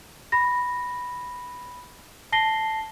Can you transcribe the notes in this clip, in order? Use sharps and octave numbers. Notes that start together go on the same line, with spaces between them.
B5 A#6
A5 A#6 C7 G7